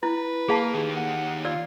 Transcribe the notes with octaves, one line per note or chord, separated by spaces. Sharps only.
E4 B4
A#3 G#4 F5 A5
D#3 G4
F#5
F4 D5 E6